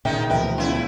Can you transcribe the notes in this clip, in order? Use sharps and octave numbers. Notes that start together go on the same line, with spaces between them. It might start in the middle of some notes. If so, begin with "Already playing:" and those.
A#2 D3 D#3 G#3 D#4 G4 E5 G5
D2 B2 E3 F3 G4 A#4 B4 E5
C#3 E4 F4 B4